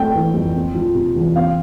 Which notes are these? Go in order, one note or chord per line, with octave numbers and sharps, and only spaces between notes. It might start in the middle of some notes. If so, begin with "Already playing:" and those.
Already playing: A3 C4 G5
E3
F2
C4
F3
C3
E2
C4 F5